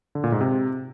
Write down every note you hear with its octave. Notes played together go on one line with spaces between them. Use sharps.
D3
A#2
G#2
C3